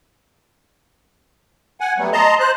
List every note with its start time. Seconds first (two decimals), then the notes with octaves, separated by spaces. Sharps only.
1.80 F#5 G#5
1.98 F#3 G3 A3 B3
2.13 D#5 A5 A#5 C6
2.40 C5 F#6